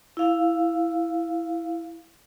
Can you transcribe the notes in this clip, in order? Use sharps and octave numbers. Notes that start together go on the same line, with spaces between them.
E4 F5